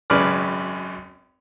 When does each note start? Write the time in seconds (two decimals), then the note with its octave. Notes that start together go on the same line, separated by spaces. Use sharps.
0.10 G#1 F#2 C#3 B4 D5 F6